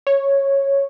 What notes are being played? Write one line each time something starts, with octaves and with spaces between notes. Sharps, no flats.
C#5